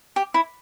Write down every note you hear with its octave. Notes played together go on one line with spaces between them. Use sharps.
G4
E4